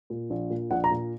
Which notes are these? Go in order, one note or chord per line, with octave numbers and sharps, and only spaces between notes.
A#2
A#1
A#2
A#1 F#5
A#5
A#2